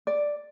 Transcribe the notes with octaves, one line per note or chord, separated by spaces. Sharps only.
D5